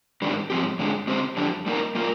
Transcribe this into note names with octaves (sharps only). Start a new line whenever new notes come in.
G#2 D#3 G3 D4
G#2 F3 C4 G4
G2 D3 G#3
D3 G#3 C4 G4 C5
F2 D3 G3 D4
G3 A#3 D#4 A#4
G3 A#3 F4 A#4